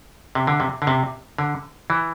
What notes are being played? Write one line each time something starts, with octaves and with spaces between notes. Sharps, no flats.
C3
D3
C3
D3
C3
D3
E3